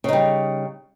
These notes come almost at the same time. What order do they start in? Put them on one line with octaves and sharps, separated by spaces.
C#3 D#4 G3